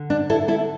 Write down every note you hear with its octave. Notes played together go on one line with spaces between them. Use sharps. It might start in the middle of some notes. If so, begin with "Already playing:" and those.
Already playing: D3
D4
E4 A4
E4 A4